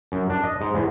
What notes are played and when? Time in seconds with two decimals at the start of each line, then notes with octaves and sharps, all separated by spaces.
0.12 F#2
0.30 D4
0.44 D#5
0.61 G#2
0.74 E2